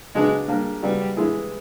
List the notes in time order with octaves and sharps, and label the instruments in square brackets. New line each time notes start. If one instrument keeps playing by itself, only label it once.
[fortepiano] C#3 F#3 B3 D4 [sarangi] G#3
[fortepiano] G3 A#3 D4 G4
[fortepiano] C#3 F#3 B3 [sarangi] G3
[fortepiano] E3 G#3 B3 E4 G#4